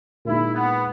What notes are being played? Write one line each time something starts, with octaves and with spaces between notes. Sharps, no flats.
A#2 G#3 D#4 E4
B3